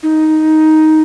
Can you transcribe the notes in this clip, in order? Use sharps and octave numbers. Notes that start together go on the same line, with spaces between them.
D#4